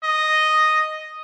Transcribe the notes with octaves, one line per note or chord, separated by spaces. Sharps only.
D#5